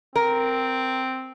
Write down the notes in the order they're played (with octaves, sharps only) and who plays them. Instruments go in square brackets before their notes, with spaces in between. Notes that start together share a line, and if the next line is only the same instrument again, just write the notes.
[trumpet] C4 [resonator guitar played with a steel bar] A#4